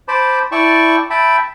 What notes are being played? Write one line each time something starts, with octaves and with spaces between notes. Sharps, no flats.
C5 A5 B5 D6
E4 D5 G5 A5 C#6
E5 G5 A5 B5